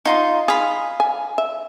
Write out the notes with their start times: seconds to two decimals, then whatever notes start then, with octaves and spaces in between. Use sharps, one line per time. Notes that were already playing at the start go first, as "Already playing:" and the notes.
0.05 D#4 F4 C6
0.48 G#4 F5 B5
1.00 G#5
1.38 E5